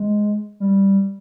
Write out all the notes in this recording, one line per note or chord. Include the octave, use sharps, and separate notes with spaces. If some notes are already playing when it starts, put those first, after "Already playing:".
Already playing: G#3
G3